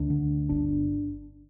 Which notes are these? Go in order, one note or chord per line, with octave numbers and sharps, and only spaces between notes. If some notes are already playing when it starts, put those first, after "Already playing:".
Already playing: D2 D4
D3
G1 D4